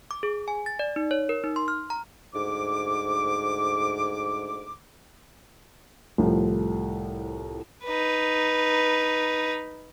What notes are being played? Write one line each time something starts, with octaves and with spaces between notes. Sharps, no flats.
D6
G#4
G#5
A6
D5
D#4
C#5
A#4
D#4
C6
F6
A#5
D2 G#2 D6
C2 A2 F3 A3
D#4 B4